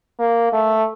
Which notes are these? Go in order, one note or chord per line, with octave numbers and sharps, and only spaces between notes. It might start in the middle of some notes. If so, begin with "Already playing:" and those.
A#3
A3